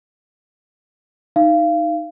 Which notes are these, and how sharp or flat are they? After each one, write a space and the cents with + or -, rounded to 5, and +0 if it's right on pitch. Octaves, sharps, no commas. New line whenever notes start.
D#4 +0 F5 -30